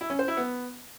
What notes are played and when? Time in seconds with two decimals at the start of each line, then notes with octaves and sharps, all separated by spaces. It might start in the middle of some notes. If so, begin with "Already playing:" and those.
0.01 E4
0.10 C#4
0.19 C5
0.28 E4
0.37 B3